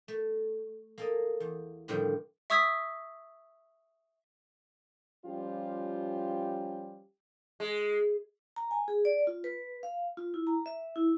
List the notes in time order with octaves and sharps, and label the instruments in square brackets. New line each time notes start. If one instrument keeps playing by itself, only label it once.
[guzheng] A3
A#3 A4 D#5
E2
A2 D3 D#3 F3 G3
[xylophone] E5 C#6 D#6 E6 G#6 B6
[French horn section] F3 G3 C#4 F4 G4
[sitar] G#3
[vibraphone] A#5
G#5
G#4
D5
F4
B4
F5
F4
E4
A#5
E5
E4